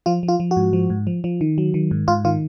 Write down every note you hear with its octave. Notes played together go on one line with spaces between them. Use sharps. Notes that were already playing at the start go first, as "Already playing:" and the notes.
F3 F4
F3
F4
F3
F#4
G#2
F3
G#2
F3
F3
D#3
F#3
D#3
G#2
G#2 F4
D#3 F4